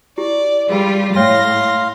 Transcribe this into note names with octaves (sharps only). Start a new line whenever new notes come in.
E4 G4 D5
G3 F4 G#4 B4 B5
A2 C#5 F5 G5 C6 A#6